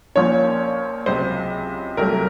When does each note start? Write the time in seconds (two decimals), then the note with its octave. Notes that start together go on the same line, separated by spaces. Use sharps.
0.15 A#1 A#2 F3 A#3 C#4 C#5
1.06 C#2 C3 F#3 C5
1.97 C2 C3 F#3 A3 A#4